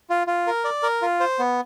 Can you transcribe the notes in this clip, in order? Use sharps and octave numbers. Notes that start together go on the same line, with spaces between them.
F4
F4
A#4
D5
A#4
F4
C5
B3